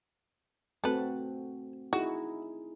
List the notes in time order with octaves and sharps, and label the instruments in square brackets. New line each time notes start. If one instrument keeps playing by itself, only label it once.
[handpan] A3 C4 F#4 [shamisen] A4 B4
[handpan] D#4 E4 G#4 [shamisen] F#4